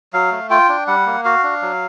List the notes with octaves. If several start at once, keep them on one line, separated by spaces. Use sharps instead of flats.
F#3 F5
A3
F4 G5
D4
G3 F#5
A#3
F#4 F5
D4
F#3